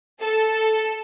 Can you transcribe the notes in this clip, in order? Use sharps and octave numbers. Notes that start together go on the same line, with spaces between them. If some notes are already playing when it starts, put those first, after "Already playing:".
A4